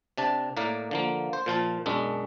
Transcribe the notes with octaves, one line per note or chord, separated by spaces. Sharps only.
C3 D4 A5
A2 A#3 A#4 D5
D3 F3 A#3
C5
A#2 F3 F4 A5
B1 F#2 G#3 D4